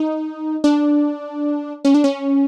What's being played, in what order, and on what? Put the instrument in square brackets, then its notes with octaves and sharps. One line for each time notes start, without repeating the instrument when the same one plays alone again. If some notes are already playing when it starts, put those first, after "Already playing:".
Already playing: [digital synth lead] D#4
D4
C#4
D4
C#4